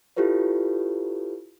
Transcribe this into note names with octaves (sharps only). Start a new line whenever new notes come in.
E4 F4 G4 A4 B4 C#5